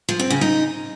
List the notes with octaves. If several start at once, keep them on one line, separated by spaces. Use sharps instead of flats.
F3
C4
C#3
D#4